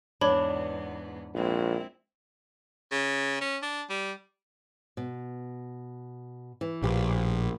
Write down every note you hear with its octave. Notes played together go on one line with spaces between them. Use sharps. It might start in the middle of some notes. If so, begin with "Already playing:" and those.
E2 G#2 B3 D4 C#5 B5
A#1 G#3 C4 E4
C#3
C#4
D4
G3
B2
E3
A#1 A2 G4